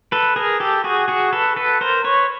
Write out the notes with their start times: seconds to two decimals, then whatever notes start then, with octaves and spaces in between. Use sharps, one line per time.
0.12 A4 B4
0.36 G#4 A#4
0.60 G4 A4
0.84 F#4 G#4
1.08 F#4 G#4
1.33 A4 B4
1.56 A4 B4
1.81 A#4 C5
2.04 B4 C#5